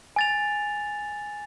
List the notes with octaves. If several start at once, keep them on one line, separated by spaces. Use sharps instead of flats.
G#5 A6 F7